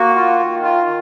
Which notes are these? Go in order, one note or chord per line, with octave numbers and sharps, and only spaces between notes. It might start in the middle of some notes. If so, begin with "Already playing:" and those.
Already playing: A#3 F#4
F4
D#3
F4
D#3